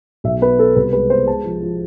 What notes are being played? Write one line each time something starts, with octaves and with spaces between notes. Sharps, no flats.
B1 E5
B3 B4
B3 A4
C2 B4
G#3 B4
B3 C5
G#3 A5
F3
F3